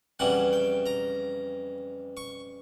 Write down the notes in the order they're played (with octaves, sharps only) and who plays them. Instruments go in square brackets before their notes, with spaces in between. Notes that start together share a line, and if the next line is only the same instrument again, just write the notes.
[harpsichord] F2 C#3 E3 G3 F#5
G5
A#5
C#6